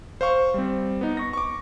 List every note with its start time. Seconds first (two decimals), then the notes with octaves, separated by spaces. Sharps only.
0.21 C5 F5 C#6
0.54 G3 C4
1.01 B3 D#4
1.17 C#6 A#6
1.33 C#6 D6